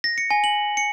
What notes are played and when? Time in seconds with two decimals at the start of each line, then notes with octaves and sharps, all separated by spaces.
0.04 A#6
0.18 C#7
0.31 G#5
0.44 F#7
0.77 C#7